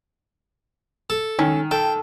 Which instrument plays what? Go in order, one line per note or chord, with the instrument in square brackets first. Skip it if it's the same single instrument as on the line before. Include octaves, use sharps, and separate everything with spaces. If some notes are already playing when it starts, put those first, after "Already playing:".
[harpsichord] A4
[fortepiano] D#3 [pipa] C#4
[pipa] A4 [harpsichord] G5